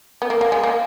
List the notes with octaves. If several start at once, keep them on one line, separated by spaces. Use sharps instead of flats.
B3
A#3
A#3
G#3
A#3